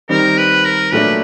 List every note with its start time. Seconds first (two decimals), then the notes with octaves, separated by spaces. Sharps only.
0.09 D#3 G3 C4 D#4 A#4
0.37 B4
0.65 A#4
0.92 A#2 F#3 A3 D4 B4